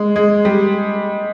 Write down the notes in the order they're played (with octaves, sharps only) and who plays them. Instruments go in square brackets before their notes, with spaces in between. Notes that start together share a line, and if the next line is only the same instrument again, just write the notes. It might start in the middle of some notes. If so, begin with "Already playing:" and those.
Already playing: [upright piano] G#3
G#3
G3